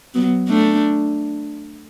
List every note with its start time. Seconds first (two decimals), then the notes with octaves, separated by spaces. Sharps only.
0.14 F#3 B3
0.48 A3 D4